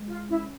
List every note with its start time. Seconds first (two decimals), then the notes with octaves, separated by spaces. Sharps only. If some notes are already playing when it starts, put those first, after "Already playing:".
Already playing: G#3
0.08 F4
0.29 C#4 E4